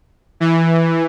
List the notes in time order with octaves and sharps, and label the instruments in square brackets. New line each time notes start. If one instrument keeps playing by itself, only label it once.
[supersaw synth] E3